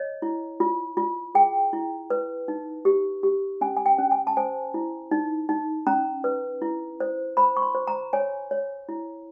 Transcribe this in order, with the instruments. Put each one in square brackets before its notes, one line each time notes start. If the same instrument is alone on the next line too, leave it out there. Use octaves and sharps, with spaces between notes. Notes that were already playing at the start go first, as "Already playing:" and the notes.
Already playing: [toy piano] C#5 D#5
E4
F4
F4
G#4 G5
E4
B4
D#4
G4
G4
C#4 G#5
G#5
G5
C#4
G#5
A5
C5 G#5
E4
D#4
D#4
C#4 A#5
B4
E4
C5
C5 B5
C#6
C6
C5
A#5
C#5 G#5
C#5
E4